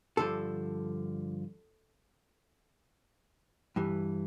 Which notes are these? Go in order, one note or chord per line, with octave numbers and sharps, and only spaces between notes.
G2 D3 F3 A4
G2 E3